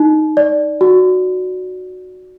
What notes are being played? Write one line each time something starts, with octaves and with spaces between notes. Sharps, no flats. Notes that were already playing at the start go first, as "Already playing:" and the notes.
Already playing: D#4
D5
F#4